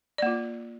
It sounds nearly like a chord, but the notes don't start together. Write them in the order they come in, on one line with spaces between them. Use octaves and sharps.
D5 A#3 F4